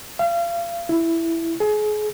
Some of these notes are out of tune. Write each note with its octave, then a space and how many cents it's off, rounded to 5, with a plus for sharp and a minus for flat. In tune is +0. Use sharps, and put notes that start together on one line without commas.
F5 -35
E4 +5
G#4 +35